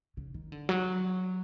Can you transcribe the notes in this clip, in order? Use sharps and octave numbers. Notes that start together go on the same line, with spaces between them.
C#3
D#3
D3
F#3